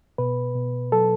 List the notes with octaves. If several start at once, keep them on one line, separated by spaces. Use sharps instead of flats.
B2 B4
B2
F#3 A4